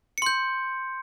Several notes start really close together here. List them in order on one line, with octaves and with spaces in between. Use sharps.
C#7 C6 G6